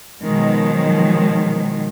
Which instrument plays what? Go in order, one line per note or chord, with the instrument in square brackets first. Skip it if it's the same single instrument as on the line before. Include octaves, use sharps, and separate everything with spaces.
[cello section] B2 D#3 F3 F#3 G#3